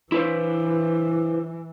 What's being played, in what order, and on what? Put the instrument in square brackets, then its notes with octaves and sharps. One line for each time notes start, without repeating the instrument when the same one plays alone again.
[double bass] E3 [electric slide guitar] E4 B4 C5